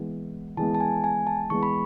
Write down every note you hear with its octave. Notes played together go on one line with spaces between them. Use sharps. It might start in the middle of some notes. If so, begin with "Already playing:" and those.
Already playing: E3 G#3 B3
E3 G#3 B3 A5
A5
G#5
G#5
A5
E3 G#3 B3 C#6
B5